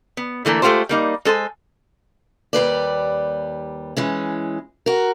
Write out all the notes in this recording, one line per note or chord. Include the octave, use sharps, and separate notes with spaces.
B3
D3 E3 A3 A#3
G#3 A3 B3 F4 G4 C5
G3 A#3 D#4
G#3 A4 C5 G#5
D#2 G3 B4 D5
E3 G#3 C#4
F#4 A#4